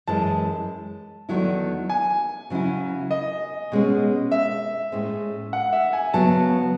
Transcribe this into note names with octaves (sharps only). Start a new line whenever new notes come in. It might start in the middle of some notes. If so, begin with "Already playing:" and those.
F#2 E3 G#3 A5
E2 D#3 F#3 A3 E4
G#5
C#3 F#3 C#4 E4
D#5
B2 G#3 C#4
E5
A2 G#3 C#4
F#5
E5
G#5
C#3 F#3 B3 A5